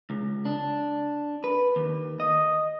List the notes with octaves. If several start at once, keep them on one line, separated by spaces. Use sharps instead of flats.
C#2
D4
B4
D#2
D#5